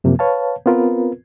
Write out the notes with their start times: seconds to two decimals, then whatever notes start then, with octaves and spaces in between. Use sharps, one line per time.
0.04 F#2 C3 F3 A#3
0.19 B4 C#5 F5 A5
0.66 B3 C4 F4 A#4 B4